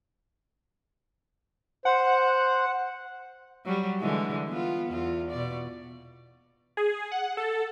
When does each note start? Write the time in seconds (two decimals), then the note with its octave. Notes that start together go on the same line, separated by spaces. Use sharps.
1.85 C5 F#5
3.65 F#3 G3
4.00 D3 E3 G#3
4.48 B3 F4
4.88 E2 F4
5.31 B2 D5
6.77 G#4
7.12 F#5
7.37 A4